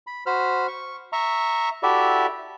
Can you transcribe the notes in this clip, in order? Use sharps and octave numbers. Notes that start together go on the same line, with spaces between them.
B5
F#4 C5 B5 F6
C#6
E5 A#5 C#6
E4 F#4 G4 A4 D5 E5